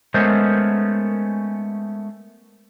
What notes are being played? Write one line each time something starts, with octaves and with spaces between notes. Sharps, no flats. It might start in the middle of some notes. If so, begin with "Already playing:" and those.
G#3 A3 B3 C#4 A#4 C5